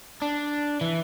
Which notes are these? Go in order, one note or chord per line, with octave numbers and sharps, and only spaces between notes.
D4
E3